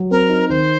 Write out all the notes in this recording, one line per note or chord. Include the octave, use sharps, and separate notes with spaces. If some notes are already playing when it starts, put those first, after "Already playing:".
Already playing: F#3
C4 A#4
D#4
D#3 C5